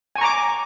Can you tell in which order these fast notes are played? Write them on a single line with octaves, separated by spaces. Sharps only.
G#5 C#6 A#5 D6